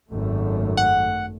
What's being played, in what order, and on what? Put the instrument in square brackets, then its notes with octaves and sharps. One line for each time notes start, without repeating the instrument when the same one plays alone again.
[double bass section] G#1 F#2 A3
[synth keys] F#5